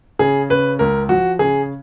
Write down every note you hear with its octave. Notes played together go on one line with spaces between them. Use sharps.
C#3 G#4
C#3 B4
C#2 A#4
F3 F#4
C#3 G#4